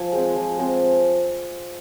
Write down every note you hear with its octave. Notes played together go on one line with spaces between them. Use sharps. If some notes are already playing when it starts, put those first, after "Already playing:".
Already playing: F3 G#5
G#3 C4
F3
G#3 C4